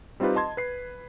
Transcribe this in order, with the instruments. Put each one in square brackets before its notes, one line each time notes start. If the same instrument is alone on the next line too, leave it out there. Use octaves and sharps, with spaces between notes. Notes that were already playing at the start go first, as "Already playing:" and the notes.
[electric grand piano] G3 C4 D#4 F4 G4 B4
D#5 A5 C6 G#6
B4 C7